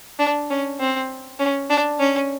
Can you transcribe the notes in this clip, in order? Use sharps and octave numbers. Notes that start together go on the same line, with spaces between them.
D4
C#4
C4
C#4
D4
C#4